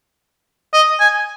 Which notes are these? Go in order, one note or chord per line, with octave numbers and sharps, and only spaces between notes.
D#5
G#5